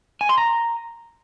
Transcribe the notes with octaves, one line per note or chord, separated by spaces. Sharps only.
G#5
C6
A#5